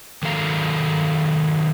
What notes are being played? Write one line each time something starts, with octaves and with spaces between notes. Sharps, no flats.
D#3 F#3 A4 F5 A#5